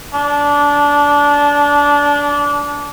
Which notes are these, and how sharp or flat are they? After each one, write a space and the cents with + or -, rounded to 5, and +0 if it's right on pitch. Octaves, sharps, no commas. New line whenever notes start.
D4 -20